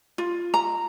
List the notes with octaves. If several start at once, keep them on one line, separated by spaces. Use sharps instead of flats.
F4
A#5